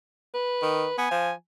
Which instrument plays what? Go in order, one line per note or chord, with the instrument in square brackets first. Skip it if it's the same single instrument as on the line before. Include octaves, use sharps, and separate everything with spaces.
[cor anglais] B4
[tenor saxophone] D#3
[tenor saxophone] B3 [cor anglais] G#5
[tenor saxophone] F3